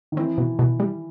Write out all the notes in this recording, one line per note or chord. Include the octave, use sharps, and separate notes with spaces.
D#3
E3 C4
B2
B2
G3